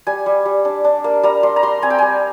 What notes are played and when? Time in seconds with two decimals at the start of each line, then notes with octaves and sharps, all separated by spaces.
0.07 G3 G#5
0.26 G3
0.45 G3
0.65 D4
0.84 D4
1.04 A#3
1.23 G3 A#5
1.43 G3 C6
1.56 A#5
1.63 G3 C6
1.82 C4 G#5
1.90 G5
1.98 G3 G#5